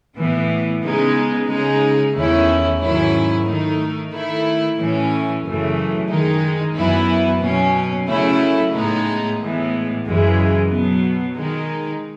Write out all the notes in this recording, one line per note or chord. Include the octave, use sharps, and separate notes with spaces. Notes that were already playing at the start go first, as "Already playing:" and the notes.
A2 E3 B3
C#3 G#3 B3 D#4
C#3 G#3 D#4
E2 D#3 A3 C#4 E4
G#2 D#3 F#3 C#4 E4
D#3 A3 D#4
D#3 A3 E4
A2 E3 A3 C#4
F#2 C#3 E3 A3
D#3 G#3 D#4
F#2 E3 B3 E4
B2 F#3 C#4
C#3 F#3 A3 C#4 E4
A2 G#3 B3 D#4
A2 E3 G#3 B3
F#2 C#3 E3 G#3
B2 F#3 B3
D#3 G#3 D#4